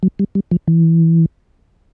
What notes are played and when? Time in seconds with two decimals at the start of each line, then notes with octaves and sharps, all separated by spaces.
0.03 F#3
0.19 G3
0.35 G3
0.51 F3
0.68 E3